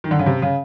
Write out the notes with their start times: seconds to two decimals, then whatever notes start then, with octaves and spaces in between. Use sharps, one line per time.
0.04 D#3
0.11 D3
0.19 C#3
0.26 C3
0.42 C#3